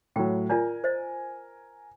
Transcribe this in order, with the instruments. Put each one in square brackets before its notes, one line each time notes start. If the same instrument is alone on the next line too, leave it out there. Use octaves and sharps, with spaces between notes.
[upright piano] A2 F#3 [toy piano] G5
[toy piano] F4 D5 [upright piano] A#4 G#5
[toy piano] C5 D#5